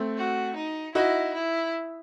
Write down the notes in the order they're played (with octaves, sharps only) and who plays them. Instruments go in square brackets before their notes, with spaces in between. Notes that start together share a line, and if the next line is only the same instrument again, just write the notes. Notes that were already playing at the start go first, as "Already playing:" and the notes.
Already playing: [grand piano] A3 C4
[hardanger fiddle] F#4
D#4
[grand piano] D#4 F#4 [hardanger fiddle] E4
[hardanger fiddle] E4